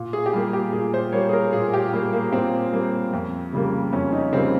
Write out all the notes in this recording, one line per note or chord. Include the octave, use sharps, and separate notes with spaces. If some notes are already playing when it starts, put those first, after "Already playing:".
Already playing: A#2
G#4
G4
G3 A#3 F4
G4
A#2 G#4
C5
G3 A#3 C#5
G#4
A#4
A#2 G#4
G4
G3 A#3
A#3
A#2 C4
G3 A#3
F2
C#3 G3 A#3
F2 C#4
D#4
C#3 G3 A#3 C4